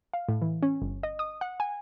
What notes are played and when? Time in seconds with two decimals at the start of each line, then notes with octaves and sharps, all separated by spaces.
0.13 F5
0.29 A2
0.42 E3
0.63 C#4
0.82 G1
1.03 D#5
1.19 D#6
1.41 F#5
1.60 G#5